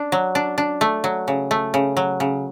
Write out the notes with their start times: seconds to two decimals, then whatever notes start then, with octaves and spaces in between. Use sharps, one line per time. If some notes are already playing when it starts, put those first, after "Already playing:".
Already playing: D4
0.12 F#3
0.35 D4
0.58 D4
0.81 A3
1.04 F#3
1.28 C#3
1.51 A3
1.74 C#3
1.97 F#3
2.20 C#3